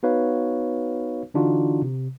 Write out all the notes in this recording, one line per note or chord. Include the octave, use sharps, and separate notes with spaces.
B3 D#4 F#4 B4 C#5 F5
D3 E3 D4 D#4 F4 F#4
C3